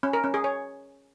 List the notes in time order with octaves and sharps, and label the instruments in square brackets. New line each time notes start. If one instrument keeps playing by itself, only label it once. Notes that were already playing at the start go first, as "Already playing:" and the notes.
[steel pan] C#4
A#4
C#4
G#4
C#5